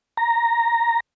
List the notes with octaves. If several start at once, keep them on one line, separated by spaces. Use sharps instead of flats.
A#5